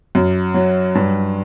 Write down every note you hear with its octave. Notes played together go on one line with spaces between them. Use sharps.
F#2
F#3
G2